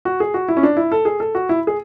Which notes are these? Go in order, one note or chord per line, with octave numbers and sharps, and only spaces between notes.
F#4
G#4
F#4
E4
C#4
D4
E4
A4
G#4
A4
F#4
E4
G#4